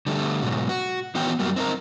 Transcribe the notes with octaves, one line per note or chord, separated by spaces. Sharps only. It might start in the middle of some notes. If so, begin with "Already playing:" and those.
D3 G3 A3
G#2 B2 F#3
F#4
D#3 E3 B3 F#4 C#5 G5
F#2 F#3 G3 A#3
C4 D#4 A#4